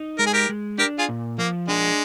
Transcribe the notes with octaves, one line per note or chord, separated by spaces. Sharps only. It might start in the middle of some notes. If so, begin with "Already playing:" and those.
Already playing: D#4
G#3 A#4
G#4
G4 A#4
G#3
D4 G4 A#4
F4 G#4
A#2
F3 A#3
G#3 D4